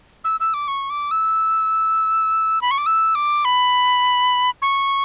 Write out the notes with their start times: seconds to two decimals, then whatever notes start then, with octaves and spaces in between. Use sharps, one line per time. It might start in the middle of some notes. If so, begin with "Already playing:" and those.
0.24 E6
0.40 E6
0.54 D6
0.68 C#6
0.90 D6
1.11 E6
2.62 B5
2.71 C#6
2.78 D6
2.86 E6
3.15 D6
3.45 B5
4.62 C#6